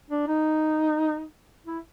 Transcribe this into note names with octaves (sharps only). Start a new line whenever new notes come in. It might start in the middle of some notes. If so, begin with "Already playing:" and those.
D4
D#4
E4